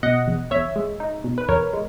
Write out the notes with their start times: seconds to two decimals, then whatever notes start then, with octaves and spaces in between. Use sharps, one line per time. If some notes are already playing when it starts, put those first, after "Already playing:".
0.03 B2 D#5 F#5
0.28 E2
0.51 E2 C#5 E5
0.76 G#3
1.00 D#4
1.24 B2
1.38 B4
1.49 E2 A#4 C#5
1.73 G#3